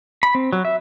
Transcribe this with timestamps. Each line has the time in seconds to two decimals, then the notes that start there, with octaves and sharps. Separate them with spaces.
0.23 B5
0.35 C4
0.53 F#3
0.65 E5